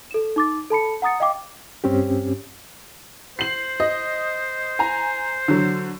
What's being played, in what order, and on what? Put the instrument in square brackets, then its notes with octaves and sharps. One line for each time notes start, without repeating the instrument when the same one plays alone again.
[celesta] A4 E7
D#4 D6 A6
A4 A5 B5 C#7
F#5 A#5 D#6 A6 C#7
D#5 F5 G5 D6
[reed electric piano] G2 C4 C#4 G4
[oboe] C5 [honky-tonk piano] C7 F#7
[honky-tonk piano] D#5
G#5 A#5
D3 F#3